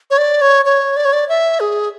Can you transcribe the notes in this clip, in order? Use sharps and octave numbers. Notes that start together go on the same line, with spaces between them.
C#5
D5
C#5
C#5
D5
C#5
D5
E5
G#4